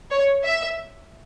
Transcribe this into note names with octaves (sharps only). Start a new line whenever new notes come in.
C#5
E5